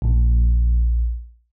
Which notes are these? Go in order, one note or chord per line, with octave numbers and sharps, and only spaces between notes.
A#1